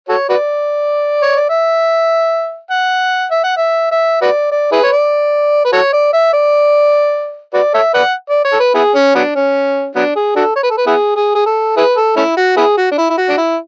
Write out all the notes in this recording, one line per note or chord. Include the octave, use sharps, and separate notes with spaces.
F#4 A4 C#5
F#4 B4 D5
C#5
D5
E5
F#5
E5
F#5
E5
E5
F#4 B4 D5
D5
E4 G#4 B4
C#5
D5
B4
F#4 A4 C#5
D5
E5
D5
F#4 B4 D5
A4 C#5 E5
B4 D5 F#5
D5
C#5
A4
B4
B3 E4 G#4
C#4
F#3 B3 D4
C#4
F#3 B3 D4
G#4
D4 F#4 A4
C#5
B4
A4
B4
B3 E4 G#4
G#4
G#4
A4
E4 G#4 B4
A4
A3 C#4 E4
F#4
B3 E4 G#4
F#4
D4
E4
E4
F#4
D4
E4